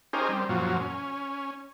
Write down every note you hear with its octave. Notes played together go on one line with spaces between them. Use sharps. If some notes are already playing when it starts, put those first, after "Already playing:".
C#4 D#4 G4 G#4 A#4 C5
G3 C4
F#2 A#2 F3 F#3
C#4